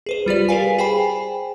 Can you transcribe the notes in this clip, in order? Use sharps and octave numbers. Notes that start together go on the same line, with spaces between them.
G#4 B4 C5
G3 F4 G4 D5
G4 G#4 A#4 B4 F5 G#5
G#4 C5 G5 G#5 B5